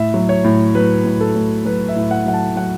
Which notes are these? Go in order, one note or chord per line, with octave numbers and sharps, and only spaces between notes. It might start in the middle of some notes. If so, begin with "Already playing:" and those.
Already playing: A2 E5
F#3
C#5
A2
F#3 B4
A2
A4
A2
F#3 B4
E5
A2
F#5
F#3 F#5
A5
F#3 F#5